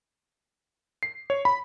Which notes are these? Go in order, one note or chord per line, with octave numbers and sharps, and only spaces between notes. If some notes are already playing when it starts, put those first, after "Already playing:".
C7
C#5
B5